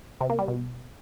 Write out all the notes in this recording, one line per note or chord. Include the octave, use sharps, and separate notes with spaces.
C3
A#3
G3
B2